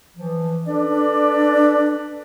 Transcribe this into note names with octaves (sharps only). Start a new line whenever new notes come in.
E3 F3
D4 A4 B4 D5
D4